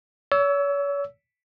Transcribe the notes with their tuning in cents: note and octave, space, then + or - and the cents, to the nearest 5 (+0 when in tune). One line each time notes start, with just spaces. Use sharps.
C#5 +35 E6 +0